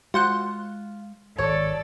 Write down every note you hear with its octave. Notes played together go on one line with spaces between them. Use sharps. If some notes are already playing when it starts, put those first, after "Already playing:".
G#3 F4 F#4 C5 F#5
G#1 A4 C#5 D5